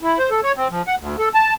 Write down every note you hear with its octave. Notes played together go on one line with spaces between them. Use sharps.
E4
C5
A4
C#5
C4
F3
F#5
D2
A4
A5